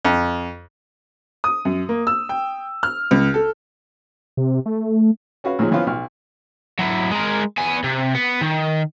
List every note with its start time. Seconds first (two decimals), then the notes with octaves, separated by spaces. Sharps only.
0.05 F2
1.44 D#6
1.65 F#2
1.89 A#3
2.07 E6
2.29 G5
2.83 F6
3.11 C#2
3.34 A4
4.37 C3
4.66 A3
5.44 C#4 F#4 B4 F5
5.59 A#2 F3 F#3 G#3
5.71 E3 F3 B3 C#4 F4
5.87 B1 F6
6.79 F#3 E4
7.11 G#3 A#4
7.57 B3 G#5
7.84 C3
8.15 B3
8.41 D#3